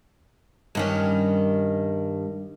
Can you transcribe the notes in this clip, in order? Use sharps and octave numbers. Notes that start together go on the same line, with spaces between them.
G2 D#3 C#4